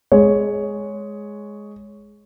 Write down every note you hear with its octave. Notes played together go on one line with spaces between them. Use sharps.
G#3 C#5